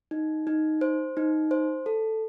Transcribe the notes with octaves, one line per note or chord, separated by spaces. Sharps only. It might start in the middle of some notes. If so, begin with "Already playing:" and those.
D#4
D#4
C5
D#4
C5
A4